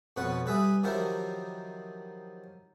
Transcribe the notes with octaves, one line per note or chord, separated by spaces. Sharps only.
F2 B2 B4 C#5 F#5
G3 B4 E5 G#5 D#6
D#3 F3 F#3 E4 G4 A#4